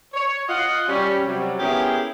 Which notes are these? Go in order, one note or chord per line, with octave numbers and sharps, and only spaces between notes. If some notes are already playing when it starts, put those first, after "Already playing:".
C#5
F4 D#5 F#5
G3 C#4
C3 F#3 G3
B3 C#4 E4 G4 G#4 A#4